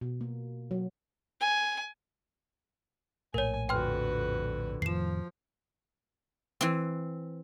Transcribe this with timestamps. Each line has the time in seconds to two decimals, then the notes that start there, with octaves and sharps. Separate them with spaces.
0.01 B2
0.21 A#3
0.71 F#3
1.41 G#5
3.34 A#1 A2 A#4 C#5 G#5
3.69 F2 D3 F#4 B4 G5 C6 F6
4.82 F2 A2 D#3 F3 C7 E7
6.61 E3 C4